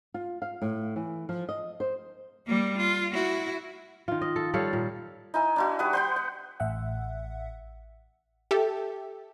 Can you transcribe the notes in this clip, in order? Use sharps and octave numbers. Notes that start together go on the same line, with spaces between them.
F4
F5
A2
E3
F3
D#5
C5
G3 A#3
F4
E4 F#4
D#3 F4
D#5
A4
G3 A4 C#5 F5
A#2
D#4 E4 G#5
D4 E4 F#4
G3 B4 F#5 D#6
B4 F#5 G5
F#5
A1 E5 F#5
G4 A4 E5